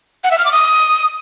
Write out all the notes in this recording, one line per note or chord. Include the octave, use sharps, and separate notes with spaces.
F#5
E5
F6
D6
D#6